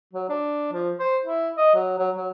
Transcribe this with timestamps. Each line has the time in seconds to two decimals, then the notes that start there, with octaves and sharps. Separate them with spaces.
0.14 F#3
0.29 D4
0.73 F3
0.99 C5
1.24 E4
1.57 D#5
1.74 F#3
1.99 F#3
2.16 F#3